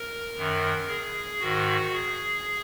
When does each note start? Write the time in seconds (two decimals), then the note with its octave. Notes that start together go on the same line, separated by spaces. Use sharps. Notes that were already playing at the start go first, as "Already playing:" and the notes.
Already playing: A#4
0.36 F#2 D#3
0.88 G#4
1.40 G#2 D#3 F#4
1.93 G#4